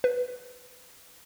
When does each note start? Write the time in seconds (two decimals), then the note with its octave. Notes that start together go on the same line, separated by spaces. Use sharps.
0.04 B4